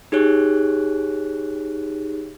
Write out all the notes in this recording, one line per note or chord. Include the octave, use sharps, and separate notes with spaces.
D#4 G4 G#4 C#5 F#6